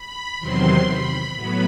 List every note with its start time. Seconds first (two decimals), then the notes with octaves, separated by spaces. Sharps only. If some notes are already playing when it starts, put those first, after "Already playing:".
Already playing: B5
0.40 E2 C3 D#3 F#3 C4 C6
0.87 B5
1.35 A2 F#3 B3 B5